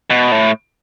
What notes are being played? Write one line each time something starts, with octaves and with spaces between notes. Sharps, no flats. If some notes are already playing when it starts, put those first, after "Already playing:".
B2
A2